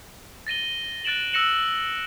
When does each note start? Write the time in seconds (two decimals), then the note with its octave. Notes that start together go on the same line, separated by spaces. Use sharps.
0.47 A6 A#6 D#7 G7
1.04 F#6 A6 D7 E7 F#7
1.33 E6 F#6 A#6 C#7 E7 F#7